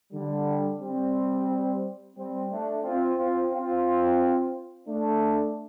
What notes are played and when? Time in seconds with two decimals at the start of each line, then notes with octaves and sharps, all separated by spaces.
0.12 D3 G3
0.81 G3 C4
2.16 G3 C4
2.50 A3 D4
2.84 C4 F4
3.17 C4 F4
3.52 C4 F4
4.87 A3 D4